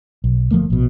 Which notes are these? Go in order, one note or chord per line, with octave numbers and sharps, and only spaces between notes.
B1
G1 F3 A3 A#3
A#1 B2